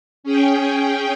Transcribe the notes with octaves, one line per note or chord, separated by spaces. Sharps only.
C#4 G#4 G5